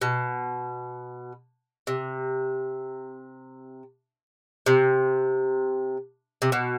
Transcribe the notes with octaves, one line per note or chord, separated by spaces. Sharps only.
B2
C3
C3
C3
B2